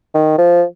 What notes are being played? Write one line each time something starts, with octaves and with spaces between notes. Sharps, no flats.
D#3
F3